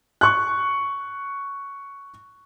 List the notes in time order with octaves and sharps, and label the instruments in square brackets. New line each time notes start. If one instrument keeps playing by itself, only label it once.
[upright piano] C#6 F#6